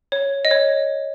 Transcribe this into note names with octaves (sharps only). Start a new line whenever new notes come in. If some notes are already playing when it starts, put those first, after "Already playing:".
C#5
D#5
C#5